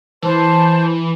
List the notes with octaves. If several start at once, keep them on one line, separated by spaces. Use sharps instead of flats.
E3 C5 A5